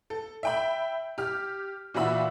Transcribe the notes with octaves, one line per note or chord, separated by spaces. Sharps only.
A4
E5 G5 B5
G4 F6
A#2 E3 F#4 E5 B5 E6